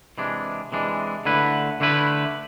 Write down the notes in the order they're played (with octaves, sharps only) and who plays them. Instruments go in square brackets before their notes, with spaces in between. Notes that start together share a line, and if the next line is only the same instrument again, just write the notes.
[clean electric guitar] C3 E3 G#3 D4
C3 E3 G#3 D4
D3 A3 E4 B4
D3 A3 E4 B4